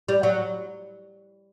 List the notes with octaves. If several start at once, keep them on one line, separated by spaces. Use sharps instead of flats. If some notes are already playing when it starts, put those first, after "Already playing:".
G3
F#3